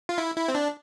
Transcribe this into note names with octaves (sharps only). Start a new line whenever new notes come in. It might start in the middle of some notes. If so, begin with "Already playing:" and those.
F4
E4
E4
C4
D4